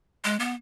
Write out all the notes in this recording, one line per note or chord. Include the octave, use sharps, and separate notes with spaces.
G#3
B3